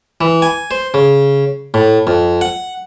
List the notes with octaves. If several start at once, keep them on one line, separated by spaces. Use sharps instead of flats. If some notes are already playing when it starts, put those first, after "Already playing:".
E3
G#5
C5
C#3
A2
F2
F#5